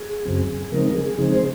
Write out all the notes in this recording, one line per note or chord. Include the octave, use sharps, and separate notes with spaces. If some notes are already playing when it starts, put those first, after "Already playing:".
Already playing: G#4
F#2 C#3 F#3 C4
C#3 F3 G#3 C4 D#4 A#4
G#4
C#3 F3 G#3 C4 D#4 G#4
C5